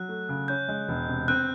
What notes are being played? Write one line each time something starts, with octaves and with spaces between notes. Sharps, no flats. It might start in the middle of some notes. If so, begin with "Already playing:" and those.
Already playing: F#3 F#6
A3
C#3
C#4 G6
G#3
E1
C3
C4 F#6